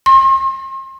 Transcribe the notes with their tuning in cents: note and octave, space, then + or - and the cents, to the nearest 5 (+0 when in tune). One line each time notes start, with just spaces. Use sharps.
C6 +40